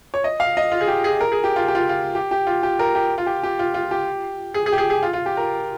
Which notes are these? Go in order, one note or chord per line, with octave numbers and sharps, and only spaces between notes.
C#5
D#5
F5
D#5
F4
G#4
G4
G#4
A#4
G#4
G4
F4
G4
F4
F4
G4
G4
F4
G4
A#4
G4
F4
G4
G4
F4
F4
G4
G#4
G#4
G4
G#4
G#4
F4
F4
G4
A#4